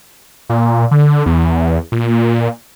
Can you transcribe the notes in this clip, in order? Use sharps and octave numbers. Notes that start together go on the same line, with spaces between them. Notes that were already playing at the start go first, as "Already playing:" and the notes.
A#2
D3
E2
A#2